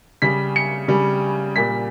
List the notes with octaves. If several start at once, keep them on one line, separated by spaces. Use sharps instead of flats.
C#3 G3 B6
C#7
C#3 G3
A#2 G3 B6